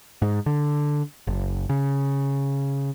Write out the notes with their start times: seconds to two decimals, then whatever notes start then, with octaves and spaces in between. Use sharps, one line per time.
0.22 G#2
0.46 D3
1.27 F#1
1.69 C#3